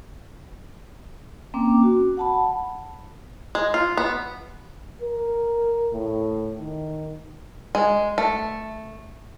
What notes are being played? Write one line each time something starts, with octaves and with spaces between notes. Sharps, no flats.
A#3 C4 C#4 G5 D6
F#4
F#5 A5 B5
G#3
F4
B3
A#4
A2
D#3
G#3
A3